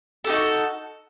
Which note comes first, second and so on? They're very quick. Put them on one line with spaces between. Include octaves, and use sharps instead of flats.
A4 G4 D#4 F#4